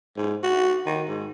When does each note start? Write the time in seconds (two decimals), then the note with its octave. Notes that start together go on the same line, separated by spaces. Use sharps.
0.17 G#2
0.43 F#4
0.86 D#3
1.08 G#2